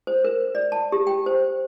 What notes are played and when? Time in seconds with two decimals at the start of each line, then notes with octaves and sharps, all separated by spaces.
0.07 C5
0.24 A#4
0.55 D5
0.72 A5
0.92 G4
1.07 G5
1.26 C5